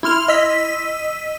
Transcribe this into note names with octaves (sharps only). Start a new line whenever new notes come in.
E4 C6 F6 F7
D#5 E6 B6